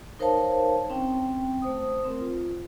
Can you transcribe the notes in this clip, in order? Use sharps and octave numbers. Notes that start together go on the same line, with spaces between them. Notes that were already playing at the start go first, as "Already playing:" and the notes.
D#4 A#4 C5 C#5 F5 A5
C4 C#4 G5
A3 C5 D#6
C4 A#4
F4